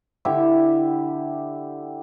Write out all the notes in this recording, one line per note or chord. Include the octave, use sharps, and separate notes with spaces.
D3 E4 G4 E5